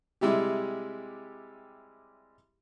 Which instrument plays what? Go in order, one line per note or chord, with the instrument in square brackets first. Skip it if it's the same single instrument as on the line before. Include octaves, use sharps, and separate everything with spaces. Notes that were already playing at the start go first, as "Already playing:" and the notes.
[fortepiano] C3 G3 G#3 E4 G4